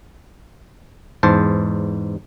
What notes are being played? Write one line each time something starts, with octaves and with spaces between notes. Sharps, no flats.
E2 G#2 C5 A5